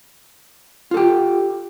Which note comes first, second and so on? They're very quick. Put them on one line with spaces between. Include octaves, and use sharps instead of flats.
F4 A4 G4